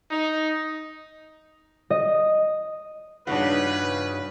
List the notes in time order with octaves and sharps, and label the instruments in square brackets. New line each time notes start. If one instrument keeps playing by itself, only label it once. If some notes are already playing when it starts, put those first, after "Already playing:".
[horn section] D#4
[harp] D#5
[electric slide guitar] G2 D#4 F4 [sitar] C#3 [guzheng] D4 F#4 [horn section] B4